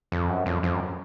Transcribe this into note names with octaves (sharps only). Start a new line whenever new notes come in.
F2
F#2
F2
F2
F#2